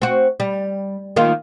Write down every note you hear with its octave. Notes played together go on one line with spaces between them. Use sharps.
C4 F#4
G3
D#3 A#3 F4